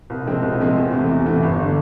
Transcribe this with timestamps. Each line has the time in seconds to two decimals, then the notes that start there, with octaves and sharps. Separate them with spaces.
0.10 C2
0.26 C3 F3 G#3 C4
0.43 C2
0.59 C3 F3 G#3 C4
0.75 E2
0.92 C3 E3 A3
1.09 E2
1.26 C3 E3 A3
1.43 G1
1.60 D3